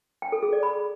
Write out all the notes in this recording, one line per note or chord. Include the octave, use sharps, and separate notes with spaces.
G5
A4
G#4
D5
B5